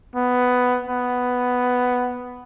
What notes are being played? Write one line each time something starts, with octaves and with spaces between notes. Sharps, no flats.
B3
B3